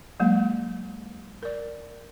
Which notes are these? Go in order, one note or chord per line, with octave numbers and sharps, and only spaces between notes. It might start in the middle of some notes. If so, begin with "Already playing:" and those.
F#3 G#3 A#3
A#4 D5